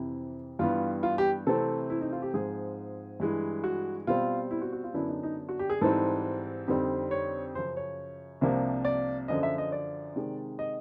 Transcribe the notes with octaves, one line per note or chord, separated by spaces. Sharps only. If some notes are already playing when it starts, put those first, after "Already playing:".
Already playing: F2 C3 E3 E4
G2 E3 G3 B3 F4
F4
G4
C3 E3 A3 C4 A4
E4
D#4
F4
G4
G#2 F3 G#3 C4 G#4
G2 E3 G#3
F#4
B2 G3 C4 F4
E4
F#4
F#4
F4
F#2 D3 F#3 B3 D4 E4
D#4
D#4
F#4
G4
G#4
G#2 E3 G3 C4 D#4 A4
F2 D3 G3 C4 D#4
C#5
F#2 C#3 F3 C5
C#5
C2 C3 F3 A#3 D4
D5
F#2 D3 F3 D#5
E5
D#5
D5
C3 D#3 G#3
D#5